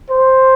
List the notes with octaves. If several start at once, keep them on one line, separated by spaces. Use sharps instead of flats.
C5